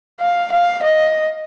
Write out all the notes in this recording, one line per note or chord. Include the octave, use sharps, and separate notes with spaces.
F5
F5
D#5